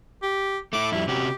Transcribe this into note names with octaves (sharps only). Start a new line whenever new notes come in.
G4
A3 E4 D6
F2 G3 E4
C3 C#4 F#4 G4